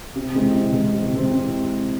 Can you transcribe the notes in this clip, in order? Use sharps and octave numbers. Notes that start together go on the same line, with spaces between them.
C3
E3 G#3 C4
C3
E3 G#3 C4
C3
E3 G#3 C4
C3